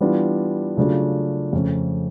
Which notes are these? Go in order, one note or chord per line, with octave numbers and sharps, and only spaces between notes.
E3 G3 B3 D4 F4
C#3 F#3 A3 D4 F4
F2 C#3 F3 A3 C#4